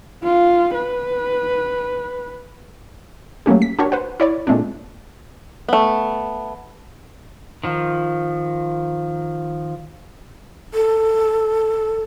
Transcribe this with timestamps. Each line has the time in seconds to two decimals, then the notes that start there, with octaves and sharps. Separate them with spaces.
0.23 F4
0.74 B4
3.46 F#3 A3 A#3 C#4 G4
3.62 B6
3.79 D4 F#4 G4 A#4 C#5
3.92 B4 C5 F#5
4.20 E4 C#5 D5
4.47 A#2 G#3 A3 C4 D4
5.69 A3 B3
7.64 D#3 F3
10.74 A4